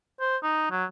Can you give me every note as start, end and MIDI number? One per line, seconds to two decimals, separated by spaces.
0.20 0.37 72
0.43 0.67 63
0.71 0.85 54